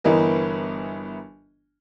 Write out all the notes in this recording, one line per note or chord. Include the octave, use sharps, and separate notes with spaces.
G1 E3 B3 A#4 D#5